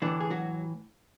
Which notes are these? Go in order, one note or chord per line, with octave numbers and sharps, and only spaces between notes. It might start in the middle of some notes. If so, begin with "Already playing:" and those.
A2 D3 E3 D4
G#4
F#3 F#4